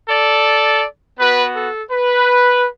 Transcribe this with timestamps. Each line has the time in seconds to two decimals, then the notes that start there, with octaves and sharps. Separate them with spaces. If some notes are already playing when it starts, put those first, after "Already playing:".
0.09 A4 D5
1.19 B3 F#4 B4
1.55 A4
1.91 B4